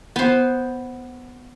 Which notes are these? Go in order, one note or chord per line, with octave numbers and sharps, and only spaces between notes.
B3 C5